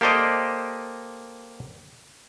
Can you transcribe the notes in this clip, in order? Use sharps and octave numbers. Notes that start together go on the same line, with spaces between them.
A#3 G4 A4 C5 D5 D#5